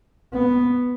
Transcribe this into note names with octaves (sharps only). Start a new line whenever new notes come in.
B3